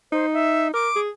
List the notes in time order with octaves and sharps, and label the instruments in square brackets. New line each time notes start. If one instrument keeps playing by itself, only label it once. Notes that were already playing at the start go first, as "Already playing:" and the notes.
[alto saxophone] D#4 [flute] C5
[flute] E5
[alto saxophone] A#4 [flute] D6
[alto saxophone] G#4